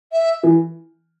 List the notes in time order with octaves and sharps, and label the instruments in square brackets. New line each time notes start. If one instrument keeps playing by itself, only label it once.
[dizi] E5
[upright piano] E3